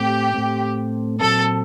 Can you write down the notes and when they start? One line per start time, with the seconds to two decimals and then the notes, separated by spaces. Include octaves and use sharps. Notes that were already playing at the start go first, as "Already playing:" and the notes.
Already playing: A2 A3 C4 G4
0.34 A2 A3 C4
1.20 A#2 F#3 C4 A4